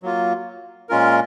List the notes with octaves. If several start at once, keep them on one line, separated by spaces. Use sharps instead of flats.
F#3 A#3 F4
A#2 G#3 C#4 F4 A#4